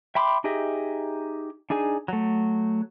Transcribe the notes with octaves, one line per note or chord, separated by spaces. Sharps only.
E5 G5 B5 C6 D6
D#4 G4 G#4 D#5 E5
D4 D#4 G#4 G#5
F#3 A3